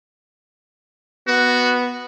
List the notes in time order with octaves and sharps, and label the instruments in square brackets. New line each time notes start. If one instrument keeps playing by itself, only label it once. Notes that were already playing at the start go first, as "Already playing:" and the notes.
[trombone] B3 [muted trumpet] F#4